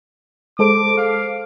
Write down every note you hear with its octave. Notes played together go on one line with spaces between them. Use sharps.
G#3 A4 C5 D6
F5